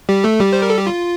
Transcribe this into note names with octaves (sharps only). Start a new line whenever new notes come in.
G3 G4
A3 A4
G3 G4
C5
A#4
A4
G4
F4